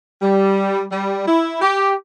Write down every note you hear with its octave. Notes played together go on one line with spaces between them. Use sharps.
G3
G3
E4
G4